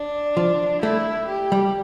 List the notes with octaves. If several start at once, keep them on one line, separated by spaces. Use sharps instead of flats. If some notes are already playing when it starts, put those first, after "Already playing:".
Already playing: D4
F3
A3 E4
G4
G3